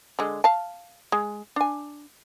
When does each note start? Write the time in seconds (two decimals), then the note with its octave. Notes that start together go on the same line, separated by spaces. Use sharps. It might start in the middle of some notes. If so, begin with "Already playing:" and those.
0.19 D3 G#3
0.44 F5 A5
1.12 G#3
1.56 D4 G#5